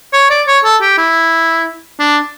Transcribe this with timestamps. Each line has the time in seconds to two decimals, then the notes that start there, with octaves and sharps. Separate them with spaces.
0.13 C#5
0.30 D5
0.48 C#5
0.65 A4
0.82 G4
0.98 E4
1.99 D4